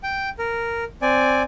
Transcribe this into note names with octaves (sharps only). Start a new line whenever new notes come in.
G5
A#4
C4 D5 G#5